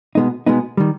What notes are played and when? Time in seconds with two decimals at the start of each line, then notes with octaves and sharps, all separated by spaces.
0.15 B2 G#3 B3 D#4
0.46 B2 G#3 B3 D#4
0.77 D#3 G3